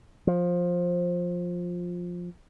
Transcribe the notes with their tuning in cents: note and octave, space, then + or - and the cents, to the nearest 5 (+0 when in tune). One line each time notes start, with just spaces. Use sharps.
F3 +15